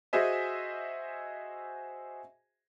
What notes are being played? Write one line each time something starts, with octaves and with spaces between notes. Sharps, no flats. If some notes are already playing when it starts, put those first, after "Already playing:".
F#4 G#4 C5 D#5 E5 G#5